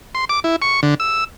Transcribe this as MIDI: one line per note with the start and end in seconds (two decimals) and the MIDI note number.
0.15 0.25 84
0.29 0.40 86
0.44 0.56 64
0.62 0.80 85
0.83 0.95 50
1.00 1.24 88